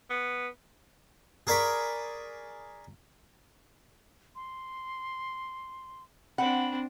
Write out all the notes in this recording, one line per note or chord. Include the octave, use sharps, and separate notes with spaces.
B3
G#4 A#4 D5 G#5 B5 C#6
C6
C4 D4 F#5 B5